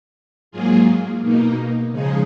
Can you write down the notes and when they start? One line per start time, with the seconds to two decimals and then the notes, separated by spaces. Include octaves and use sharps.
0.51 G#2 F#3 A#3 F4 G#4
1.21 B2 A#3 D#4
1.92 C#3 F3 G#3 D#4 G#4